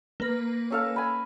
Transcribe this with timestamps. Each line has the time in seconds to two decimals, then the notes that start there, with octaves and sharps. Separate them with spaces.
0.20 A#3 B4 A#6
0.70 C#4 A4 F5
0.96 G#5 B5